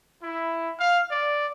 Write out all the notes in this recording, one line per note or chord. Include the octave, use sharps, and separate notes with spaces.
E4
F5
D5